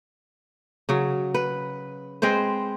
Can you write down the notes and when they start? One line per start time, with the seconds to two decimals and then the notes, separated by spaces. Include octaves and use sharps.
0.89 C#3 F#3
1.34 B4
2.22 G#3 C4 B4 C5